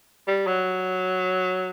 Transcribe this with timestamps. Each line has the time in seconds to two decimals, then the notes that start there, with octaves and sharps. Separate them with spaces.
0.27 G3
0.47 F#3